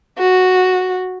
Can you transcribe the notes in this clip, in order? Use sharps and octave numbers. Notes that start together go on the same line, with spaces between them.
F#4